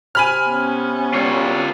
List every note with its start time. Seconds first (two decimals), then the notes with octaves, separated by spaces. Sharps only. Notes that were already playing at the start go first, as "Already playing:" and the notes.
0.15 C3 G#5 B5 F6
0.48 B3 C#4
1.14 C2 F#3 G3 F4 C#5